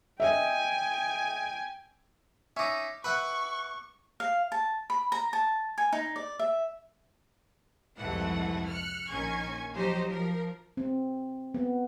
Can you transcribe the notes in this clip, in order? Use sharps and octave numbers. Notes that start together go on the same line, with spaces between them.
D#5 E5 G5 G#5
C#4 D#4 E5 D6
B4 E5 F#5 B5 C#6 F#6
F5
A5
B5
A#5
A5
G#5
D#4
D5
E5
C2 F2 G#2 E3 A3 F#5
F6 F#6 C#7
A#1 D#3 C#4 G#5 C#6 G#6
F3 F#3 D#4 G4 C5 D#5
F3 A#4
C4
B3